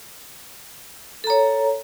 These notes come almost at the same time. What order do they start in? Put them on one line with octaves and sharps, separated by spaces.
A4 A#5 C#5